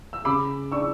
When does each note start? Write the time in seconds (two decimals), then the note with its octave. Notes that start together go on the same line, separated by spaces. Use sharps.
0.13 E6
0.25 C#3 B5 D6
0.72 D4 C#6 E6